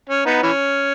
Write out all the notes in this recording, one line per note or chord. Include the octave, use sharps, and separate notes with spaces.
C#4
B3 D#4
E3 C#4